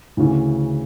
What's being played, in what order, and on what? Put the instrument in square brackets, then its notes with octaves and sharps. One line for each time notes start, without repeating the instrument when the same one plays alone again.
[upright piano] D2 C#3 E3